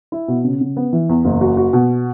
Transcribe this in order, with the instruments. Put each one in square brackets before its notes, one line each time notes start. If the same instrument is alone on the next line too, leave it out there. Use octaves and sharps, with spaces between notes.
[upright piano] E4
B2
C#3
C#3
B3
E3
E2
F#1
F#4
F#4
B2